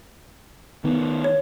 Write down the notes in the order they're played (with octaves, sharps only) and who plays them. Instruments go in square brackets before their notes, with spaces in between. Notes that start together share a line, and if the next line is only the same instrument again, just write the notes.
[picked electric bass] D#3 B3
[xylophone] C#5